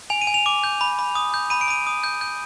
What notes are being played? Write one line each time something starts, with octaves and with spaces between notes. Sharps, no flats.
G#5 F7
D#7
G#5
F7
D6
G6
B5
B5
D#6
G6
B5 D#7
D7
B5 D#7
D#6
G6
G6